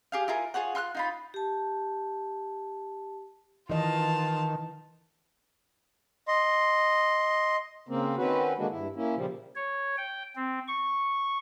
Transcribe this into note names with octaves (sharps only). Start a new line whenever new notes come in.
G4 G#4 F5
E4 F4 G#4 A#4
F4 G#4 C#5 F#5
F4 C6 F6 F#6
D#4 F4 B5
G4 A5
D#3 E3 F4 D#5 A5
D#5 C6
C#3 A#3 C4
D#3 C4 C#4 F#4 B4
D3 D#3 G#3 A#3 D4 F#4
G2 E4
A#3 C#4 E4
A#2 C#3 F3 G3
C#5
G5
C4
C#6